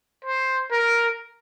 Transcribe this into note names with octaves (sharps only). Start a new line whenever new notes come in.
C5
A#4